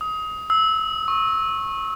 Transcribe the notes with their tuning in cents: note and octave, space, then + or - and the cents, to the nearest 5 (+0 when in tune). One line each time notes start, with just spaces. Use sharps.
D#6 +25
E6 -20
C#6 -20